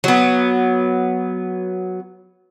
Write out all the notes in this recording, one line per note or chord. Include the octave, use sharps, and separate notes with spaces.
F#3 B3